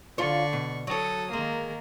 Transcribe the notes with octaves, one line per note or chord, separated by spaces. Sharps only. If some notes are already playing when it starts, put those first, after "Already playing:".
D3 F4 C#5 D5 C#6
B2
F#3 A4 C#5 D#6
D#3 G#3 A#3